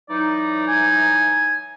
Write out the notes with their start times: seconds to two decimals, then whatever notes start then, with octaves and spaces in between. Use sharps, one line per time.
0.10 E3 F#3 D#4 D5
0.68 G#5